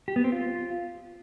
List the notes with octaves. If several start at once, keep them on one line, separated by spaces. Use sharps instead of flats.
G4
B3
C4
F4